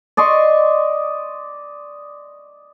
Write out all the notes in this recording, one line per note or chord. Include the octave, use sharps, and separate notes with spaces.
D5 D#5 C6 C#6